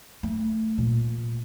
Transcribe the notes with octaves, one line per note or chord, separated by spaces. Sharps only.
A3
A#2